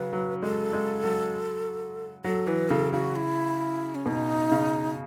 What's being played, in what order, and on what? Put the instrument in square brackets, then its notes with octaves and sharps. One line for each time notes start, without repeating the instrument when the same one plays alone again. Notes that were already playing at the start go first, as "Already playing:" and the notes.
Already playing: [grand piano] C#3 F#3 [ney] B4
[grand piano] F#3
[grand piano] G#3 [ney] A4
[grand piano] G#3
F#3
[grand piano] F#3 [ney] A4
[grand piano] E3 [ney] B4
[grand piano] C#3 [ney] A4
[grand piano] C#3 [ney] F#4
[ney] E4
C#4
[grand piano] B2 [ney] D#4
[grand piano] C#3